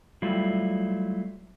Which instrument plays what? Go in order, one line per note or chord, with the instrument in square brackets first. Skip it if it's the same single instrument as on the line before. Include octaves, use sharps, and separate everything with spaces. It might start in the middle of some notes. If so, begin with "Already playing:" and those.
[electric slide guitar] F#3 G3 A3 E4 F4